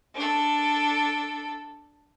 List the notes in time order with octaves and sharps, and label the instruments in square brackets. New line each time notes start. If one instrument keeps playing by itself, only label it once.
[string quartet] D4 A4